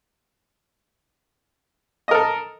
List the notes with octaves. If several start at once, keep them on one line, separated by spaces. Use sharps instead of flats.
A4 A#4 D#5